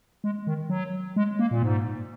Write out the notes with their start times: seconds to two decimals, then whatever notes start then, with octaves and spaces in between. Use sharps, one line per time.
0.24 G#3
0.47 D#3
0.70 F#3
1.16 G#3
1.39 A#3
1.51 A#2
1.63 G#2